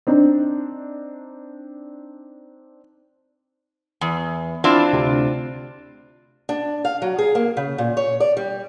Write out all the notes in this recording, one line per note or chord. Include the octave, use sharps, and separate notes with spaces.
C4 D4 D#4
E2
C4 D4 E4 F4
D2 C3
D4
F5
F#3
G#4
A#3
C#3
A#2
C#5
D5
G3